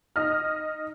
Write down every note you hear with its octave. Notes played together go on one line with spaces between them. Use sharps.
D#4 D#5 F6